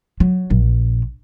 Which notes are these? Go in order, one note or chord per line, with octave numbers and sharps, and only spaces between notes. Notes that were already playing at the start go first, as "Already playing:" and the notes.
F#3
A#1